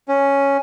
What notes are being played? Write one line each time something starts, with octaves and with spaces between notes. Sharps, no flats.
C#4